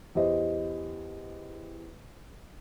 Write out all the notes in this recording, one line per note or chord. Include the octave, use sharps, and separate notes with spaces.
E2 G4 C5 D#5